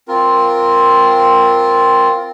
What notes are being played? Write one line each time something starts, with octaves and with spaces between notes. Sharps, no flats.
C4 F4 A#4